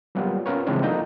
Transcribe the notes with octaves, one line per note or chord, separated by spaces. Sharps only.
F#3 G3 A#3 B3 F4
B3 C#4 F4 A#4 B4 C#5
C#3 E3 G#3 C4 D4 F4
F3 A#3 D#4 A4 A#5 G6